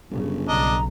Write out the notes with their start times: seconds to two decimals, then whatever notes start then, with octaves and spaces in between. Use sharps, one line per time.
0.11 G1 F#2 C#3
0.48 B1 D4 D#5 A#5